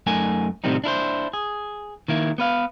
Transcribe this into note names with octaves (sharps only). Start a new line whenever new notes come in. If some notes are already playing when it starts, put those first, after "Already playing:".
F#2 A3 D#4 A#4 G#5
A2 C3 D#3 G3 C4 D#4
D4 E4 A#4 C5
G#4
D#3 A#3 E4
B3 B4 F5